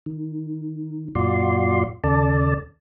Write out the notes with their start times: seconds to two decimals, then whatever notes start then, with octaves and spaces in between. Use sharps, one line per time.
0.06 D#3
1.15 F#2 A#2 F4 F#4 D5 C6
2.04 D#2 C#3 A4 D5 A5